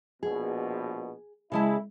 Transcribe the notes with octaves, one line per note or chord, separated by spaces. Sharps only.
A#1 B2 G#4
C#3 G#3 E4 A5